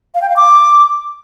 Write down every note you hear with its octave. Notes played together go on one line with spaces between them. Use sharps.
F5
G5
F5
D6